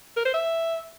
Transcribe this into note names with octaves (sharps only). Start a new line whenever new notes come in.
A#4
C5
E5